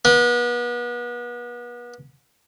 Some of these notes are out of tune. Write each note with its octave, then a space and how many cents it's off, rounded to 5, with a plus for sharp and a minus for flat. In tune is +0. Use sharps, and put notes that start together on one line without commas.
B3 -35